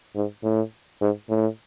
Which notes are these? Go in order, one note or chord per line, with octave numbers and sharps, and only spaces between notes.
G#2
A2
G#2
A2